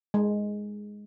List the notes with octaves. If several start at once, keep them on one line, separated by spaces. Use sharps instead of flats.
G#3